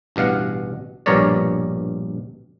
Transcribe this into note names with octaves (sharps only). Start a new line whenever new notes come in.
A1 G2 B2 F5 F#5
A#1 G2 B2 A#4 C#5 D5